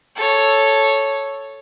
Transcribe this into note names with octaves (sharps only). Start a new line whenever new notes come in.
A4 C#5